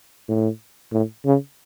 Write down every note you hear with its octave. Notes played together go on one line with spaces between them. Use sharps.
A2
A2
C#3